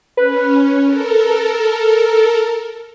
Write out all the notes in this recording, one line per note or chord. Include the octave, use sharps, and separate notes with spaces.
C#4 B4
A4 A#4